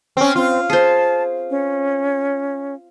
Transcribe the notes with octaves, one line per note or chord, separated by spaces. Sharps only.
C4 C#4
C4 F4
G#4 C5 A5
C#4